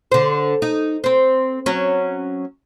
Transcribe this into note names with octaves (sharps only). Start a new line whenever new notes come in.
D3 C5
D#4
C4 C5
F#3 C#4